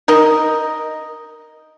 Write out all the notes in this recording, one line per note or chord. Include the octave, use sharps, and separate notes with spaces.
D#4 A#4 D#5